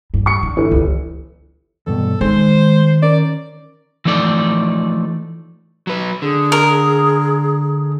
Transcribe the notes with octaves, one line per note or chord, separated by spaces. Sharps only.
G2
C#6 C#7
D3
G1 E3
C#2
E2 G2 B2 A4
D#3 G#3 C5
C#4 A#4 D5
E3 F3 A3 D#4 D5
F#3 B4
D3 G#4
A#4